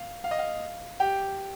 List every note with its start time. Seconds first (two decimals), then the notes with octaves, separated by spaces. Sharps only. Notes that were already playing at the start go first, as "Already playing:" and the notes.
Already playing: F5
0.24 F5
0.31 D#5
0.39 F5
1.00 G4 G5